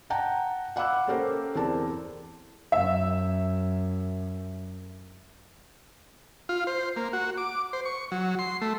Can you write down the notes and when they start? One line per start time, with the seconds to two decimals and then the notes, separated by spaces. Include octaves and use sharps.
0.10 F#5 G5 A5 A#5
0.76 F5 F#5 B5 D6 E6 F#6
1.07 A#3 C#4 G4 A4 A#4 C5
1.55 E2 C4 A#4 D5 A5
2.72 F#2 E5
6.49 F4
6.67 C5
6.96 A#3
7.13 F#4
7.38 D6
7.73 C5
7.85 C#6
8.12 F#3
8.39 C6
8.62 A3